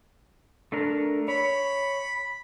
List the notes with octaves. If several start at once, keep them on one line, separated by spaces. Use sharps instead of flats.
A3 D4 A#4
C#5 B5